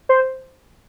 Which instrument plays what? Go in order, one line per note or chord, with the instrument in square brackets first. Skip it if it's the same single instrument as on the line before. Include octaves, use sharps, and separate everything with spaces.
[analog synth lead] C5